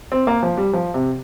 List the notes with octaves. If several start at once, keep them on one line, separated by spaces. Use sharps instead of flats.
C4
A#3
F3
G3
F3
C3